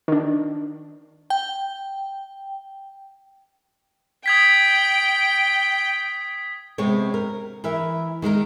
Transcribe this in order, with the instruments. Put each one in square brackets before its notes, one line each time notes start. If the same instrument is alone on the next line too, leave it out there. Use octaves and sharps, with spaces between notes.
[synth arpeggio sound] D#3 D4
[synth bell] G5
[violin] G5 [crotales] D#6 G#6 B6
[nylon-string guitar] C3 G#3 B3 C4 C#5
A#4
E3 A#4 E5
D#3 G#3 D#4 A#4